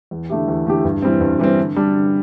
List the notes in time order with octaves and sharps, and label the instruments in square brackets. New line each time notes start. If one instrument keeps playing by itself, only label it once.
[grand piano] E2
D3 A3 E4 G4
E2
D3 A3 E4 G4
G2
E3 G3 C4
G2
E3 G3 C4
D3
G3 D4
D3